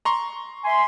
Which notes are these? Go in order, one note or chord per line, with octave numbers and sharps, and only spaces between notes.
A#5 C6 C#6
E5 G#5 C6